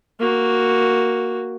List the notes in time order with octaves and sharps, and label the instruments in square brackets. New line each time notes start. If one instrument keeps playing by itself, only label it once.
[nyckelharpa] A#3 F#4